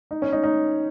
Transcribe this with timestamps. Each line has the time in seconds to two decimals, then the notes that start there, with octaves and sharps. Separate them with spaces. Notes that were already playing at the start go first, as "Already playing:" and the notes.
0.11 D#4
0.22 C#4
0.32 D#4
0.43 D#4